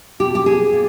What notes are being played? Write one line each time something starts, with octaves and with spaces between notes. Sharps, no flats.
B2 G4
G4
G#4
A#2